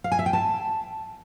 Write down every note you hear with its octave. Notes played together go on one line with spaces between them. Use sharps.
F5
G#5
E5
G5
A5